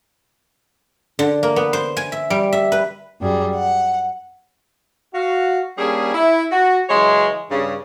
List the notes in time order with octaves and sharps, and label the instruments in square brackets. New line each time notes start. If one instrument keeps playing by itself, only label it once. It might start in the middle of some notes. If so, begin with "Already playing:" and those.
[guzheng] D3
A#3
B3
C5
G#5
E5
G3
E5
B4
[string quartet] F#2 G3 G#4
F#5
[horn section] F#4 F5
G3 A#3 C#4 D4 G#4
E4
F#4
C#3 E3 F#3 G#3 C#5 C6
G2 C#3